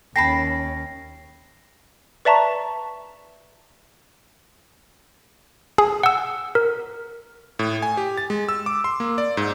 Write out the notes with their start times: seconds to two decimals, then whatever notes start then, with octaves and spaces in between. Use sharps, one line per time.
0.16 D#2 C#4 G5 A5 B5 A#6 C7
2.25 B4 D5 E5 A5 A#5 C#6
5.78 G#4
6.03 F#5 E6
6.55 A#4
7.59 A2
7.82 G#5
7.97 G4
8.18 A6
8.30 G#3
8.49 E6
8.66 D6
8.84 C6
9.00 A#3
9.18 D5
9.37 G#2